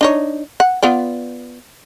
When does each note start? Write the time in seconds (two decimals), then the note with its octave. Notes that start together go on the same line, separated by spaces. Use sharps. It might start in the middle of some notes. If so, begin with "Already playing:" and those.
0.01 D4 D#4 C#5
0.60 F#5
0.83 B3 F4 D5